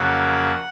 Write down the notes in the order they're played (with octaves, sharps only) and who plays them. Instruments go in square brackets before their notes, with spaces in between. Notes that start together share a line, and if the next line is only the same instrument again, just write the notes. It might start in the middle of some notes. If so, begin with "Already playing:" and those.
Already playing: [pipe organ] F2 C#3 F#3 A#3 F#5